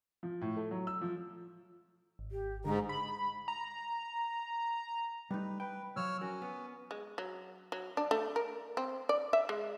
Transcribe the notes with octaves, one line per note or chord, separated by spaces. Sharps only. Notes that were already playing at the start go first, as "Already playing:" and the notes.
F3
A2
A3
F#3
E6
F3
G#1
G4
G#2 D3 A#5
B5
A#5
G3 A3 D#4 B4
B4 G5
F3 F#3 C#5 E6 F6
C#4 F#4 A#4
B3
G#3
F#3
F#3
D4
A3
A#4
C4
D5
E5
G#3